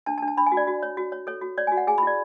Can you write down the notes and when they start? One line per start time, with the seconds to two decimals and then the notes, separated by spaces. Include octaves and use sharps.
0.06 D4 A5
0.18 A5
0.22 D4
0.28 A5
0.37 D4 B5
0.46 G#5
0.52 F#4
0.57 D5
0.67 F#4
0.83 C#5
0.97 F#4
1.12 C#5
1.27 A4 C#5
1.42 F#4
1.58 C#5 D5
1.67 G#5
1.72 F#4
1.77 F#5
1.87 G#4 G#5
1.98 B5
2.03 E4 D5